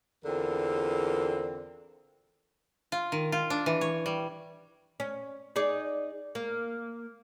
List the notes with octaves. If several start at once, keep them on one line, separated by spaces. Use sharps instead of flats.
E2 D3 C4 F4 A#4
F4
D#3
F4
D4
E3
C#5
G3
C#4
D#4 G#4 D5
A#3